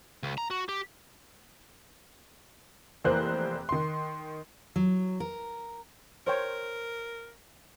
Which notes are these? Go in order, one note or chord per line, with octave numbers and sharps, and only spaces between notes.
C#2
A#5
F#4
G4
F1 E3 A#3 C5 F#6
D#3 C6
F#3
A#4
A#4 C5 C#5 G5